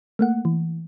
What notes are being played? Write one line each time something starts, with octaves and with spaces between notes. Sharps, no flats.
A3 A#3 F#5
E3